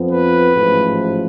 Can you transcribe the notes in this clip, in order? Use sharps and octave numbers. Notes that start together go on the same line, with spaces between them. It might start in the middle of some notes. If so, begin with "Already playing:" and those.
Already playing: F2 F3 B3
B4
A1 G#2 F3